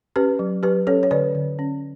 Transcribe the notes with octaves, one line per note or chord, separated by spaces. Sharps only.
C#4 G4 B4
F#3
F#3 G4 B4
C#4 A4 C#5
C#5
D3 B4 D5
D3
C#4